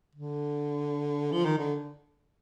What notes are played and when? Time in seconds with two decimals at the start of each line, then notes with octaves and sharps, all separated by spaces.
0.15 D3
1.32 F3
1.45 D#3
1.58 D3